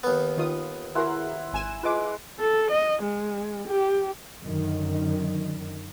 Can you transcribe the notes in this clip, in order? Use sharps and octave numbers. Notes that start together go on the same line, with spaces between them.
D#2 B3
D#3 F4 D#6
E4 F#4 G#4 A#4 F#5 C6
G#1 G#5 E7
G#3 F4 B4 D6
A4
D#5
G#3
G4
F#2 D3 D#3